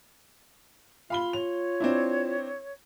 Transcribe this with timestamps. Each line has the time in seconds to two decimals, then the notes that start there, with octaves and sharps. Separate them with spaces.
1.10 F4 F5 B5 G7
1.33 C#5 F7
1.80 C4 D4 E4